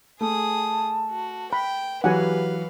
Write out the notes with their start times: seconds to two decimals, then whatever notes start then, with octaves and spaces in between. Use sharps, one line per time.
0.21 A3 G#4 A5 D#6
1.11 F#4
1.53 G5 B5
2.04 E3 F#3 F#4 G4 B4 F5 F#5 G#5